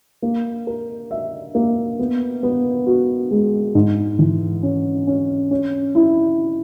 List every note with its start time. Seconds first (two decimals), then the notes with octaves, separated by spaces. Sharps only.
0.22 A#3
0.67 A#4
1.11 E5
1.55 A#3
1.99 B3
2.43 B3
2.86 F#4
3.31 G#3
3.75 G#2
4.19 E3
4.63 C#4
5.07 C#4
5.51 C#4
5.95 E4